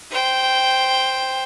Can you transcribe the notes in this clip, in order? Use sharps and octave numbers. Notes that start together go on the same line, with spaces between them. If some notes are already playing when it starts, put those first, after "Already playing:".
C5 G5